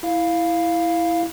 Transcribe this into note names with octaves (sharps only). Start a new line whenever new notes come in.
E4 F5